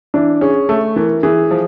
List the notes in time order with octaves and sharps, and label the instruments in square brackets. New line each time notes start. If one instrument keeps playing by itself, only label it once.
[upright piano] E3 [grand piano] D4
[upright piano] C#4 [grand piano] G#4
[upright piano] A3 [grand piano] A4
[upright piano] E3 [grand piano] A#4
[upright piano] E3 [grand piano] G#4
[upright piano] F3